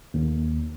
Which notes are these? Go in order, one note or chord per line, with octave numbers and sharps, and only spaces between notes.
D#2